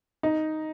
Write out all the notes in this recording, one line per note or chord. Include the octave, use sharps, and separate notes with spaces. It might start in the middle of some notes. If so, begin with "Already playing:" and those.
D#4